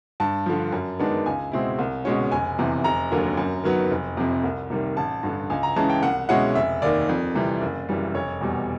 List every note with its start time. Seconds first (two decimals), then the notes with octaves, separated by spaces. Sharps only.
0.20 G2 A5
0.46 D3 F3
0.72 F#2
0.99 D#3 G#3 B3 D4
1.26 C#2 G#5
1.52 B2 G#3 C4 E4
1.79 C2
2.05 B2 G#3 C#4
2.32 F1 G#5
2.58 E2 C3 E3
2.84 F1 A#5
3.11 D#2 D3 F#3 A#3
3.37 F#2
3.64 D#3 F#3 B3
3.91 F1
4.17 F2 C3
4.44 C2
4.70 C3 D#3 G3 A#3
4.97 A1 A5
5.23 G2 D3
5.50 C#2 G#5
5.63 A#5
5.76 C#3 E3 G#3 A5
5.90 G5
6.02 C2 F#5
6.29 B2 G#3 C#4 E4 F#5
6.55 F1 E5
6.82 D#2 D#3 D5
7.09 F2
7.35 C3 E3 G3
7.62 F#1
7.89 F#2 C#3 E3 G3
8.15 F1 C#5
8.41 E2 B2 G3